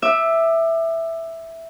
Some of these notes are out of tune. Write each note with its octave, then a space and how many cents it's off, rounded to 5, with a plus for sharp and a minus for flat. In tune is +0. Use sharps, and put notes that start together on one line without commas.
E5 +0 D6 +35